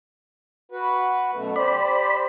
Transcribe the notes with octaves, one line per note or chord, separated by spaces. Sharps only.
F#4 B4
F#2 B2 A3
G4 C5 D5 B5